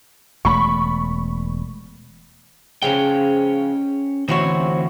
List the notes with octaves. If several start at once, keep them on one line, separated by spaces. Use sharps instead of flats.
E1 A3 B5 C#6
C#3 F3 G#3 C#4 C#5 G5
D2 E3 C4 F#4 C5 C#5